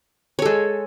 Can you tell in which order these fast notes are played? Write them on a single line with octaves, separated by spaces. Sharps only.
C#5 A4 G#3